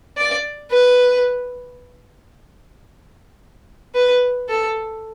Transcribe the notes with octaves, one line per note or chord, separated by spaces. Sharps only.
D5
B4
B4
A4